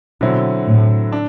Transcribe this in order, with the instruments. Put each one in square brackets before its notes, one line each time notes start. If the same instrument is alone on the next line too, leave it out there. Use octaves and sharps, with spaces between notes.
[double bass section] B2 [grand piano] D3 F#3 C4 E4
[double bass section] A2
[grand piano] D4